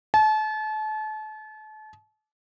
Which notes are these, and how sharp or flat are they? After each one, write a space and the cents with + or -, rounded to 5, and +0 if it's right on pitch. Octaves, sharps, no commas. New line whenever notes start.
A5 -35